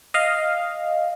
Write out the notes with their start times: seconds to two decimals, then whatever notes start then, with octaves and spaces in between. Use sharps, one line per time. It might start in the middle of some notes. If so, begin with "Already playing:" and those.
0.14 D#5 F5